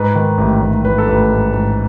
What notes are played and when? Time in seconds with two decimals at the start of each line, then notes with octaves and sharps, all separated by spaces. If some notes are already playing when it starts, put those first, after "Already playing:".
Already playing: G#2 B4
0.15 D#3
0.38 A1
0.61 A1
0.85 A1 B4
0.98 A4
1.07 A1 B4
1.30 G#2
1.53 G#2